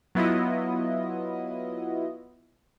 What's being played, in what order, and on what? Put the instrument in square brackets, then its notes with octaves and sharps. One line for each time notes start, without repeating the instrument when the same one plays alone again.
[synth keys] F#3 B3 E4 F4 D#5